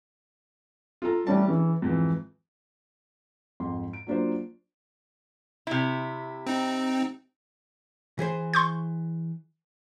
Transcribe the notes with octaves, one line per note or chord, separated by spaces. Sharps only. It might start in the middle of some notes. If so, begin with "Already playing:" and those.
F4 A4 A#5
A1 G3 C#4 A5
C#3 E3
F2 G#2 E3
F2 G#2 C6
D7
F#3 A#3 D4 F4 C5
C3 E4
C4 D#4
E3 G#4 C5
C6 C#6 G6